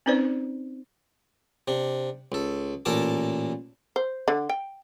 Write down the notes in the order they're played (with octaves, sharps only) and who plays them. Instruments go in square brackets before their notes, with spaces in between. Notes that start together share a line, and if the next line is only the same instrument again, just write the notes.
[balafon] C4 C#4 D#4 B4 C5 D5
[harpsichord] C3 D4
C#2 A4
A1 A#2 A4 A#4 A5 D6
[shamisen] C5
D3
G5